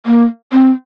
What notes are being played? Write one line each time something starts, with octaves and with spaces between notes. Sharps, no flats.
A#3
C4